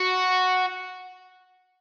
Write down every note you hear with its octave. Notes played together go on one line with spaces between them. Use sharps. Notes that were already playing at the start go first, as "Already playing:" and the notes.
Already playing: F#4